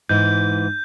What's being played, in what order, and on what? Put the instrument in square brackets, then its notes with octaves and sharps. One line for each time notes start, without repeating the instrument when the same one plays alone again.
[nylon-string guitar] G#2 E3 [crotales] G6